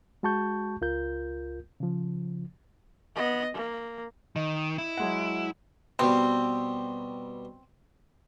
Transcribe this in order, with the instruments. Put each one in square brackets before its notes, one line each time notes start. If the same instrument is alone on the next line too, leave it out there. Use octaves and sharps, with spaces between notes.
[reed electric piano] G#3 F#4 A5 C#6 G6
C#2 F4 A#4 G6
C#3 F3
[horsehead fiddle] B3 D#5
A#3
[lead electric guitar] D#3 [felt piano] D#5
[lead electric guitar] E4
[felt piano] F#3 G#3 F#5
[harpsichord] B2 G3 [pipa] C4